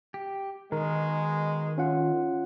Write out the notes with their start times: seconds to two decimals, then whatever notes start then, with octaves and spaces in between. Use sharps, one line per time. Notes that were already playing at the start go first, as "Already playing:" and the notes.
0.14 G4
0.72 B2 D#3 G#3 A#4
1.78 C#4 F4 F#5